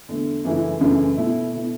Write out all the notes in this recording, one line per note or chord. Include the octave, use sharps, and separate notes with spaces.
E2 D3 A3
F#2 C#3 E3 A3 E4
F#2 C#3 E3 A3 E4
B2 A3 E4
B2 A3 E4